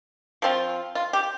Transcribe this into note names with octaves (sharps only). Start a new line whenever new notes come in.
F3 C4 F4
F4
G4